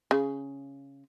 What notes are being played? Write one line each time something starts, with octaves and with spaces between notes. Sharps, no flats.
C#3